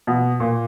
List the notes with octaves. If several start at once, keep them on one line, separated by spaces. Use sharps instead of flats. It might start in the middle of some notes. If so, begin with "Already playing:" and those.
B2
A#2